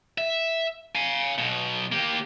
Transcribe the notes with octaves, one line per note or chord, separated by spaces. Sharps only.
E5
F5 G#5
B1 B2
A#3 G4